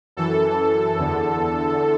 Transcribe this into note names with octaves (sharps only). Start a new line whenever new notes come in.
F#2 E3 A4
E2 D3